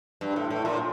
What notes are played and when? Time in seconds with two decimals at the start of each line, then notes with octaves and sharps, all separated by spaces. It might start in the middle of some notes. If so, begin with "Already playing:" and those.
0.21 G2
0.36 A2
0.50 A2
0.65 A#2